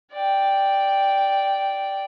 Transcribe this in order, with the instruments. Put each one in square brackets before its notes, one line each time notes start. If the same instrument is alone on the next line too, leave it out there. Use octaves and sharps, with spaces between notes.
[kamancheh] D5 G5